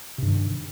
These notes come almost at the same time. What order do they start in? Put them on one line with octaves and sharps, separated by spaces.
C3 G2 D#3